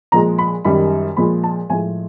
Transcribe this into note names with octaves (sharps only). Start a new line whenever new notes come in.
A#2 F3 G#3 A#5
B5
F#2 D#3 G3 B5
A#2 F3 G#3 B5
A5
A2 F3 G#3 G#5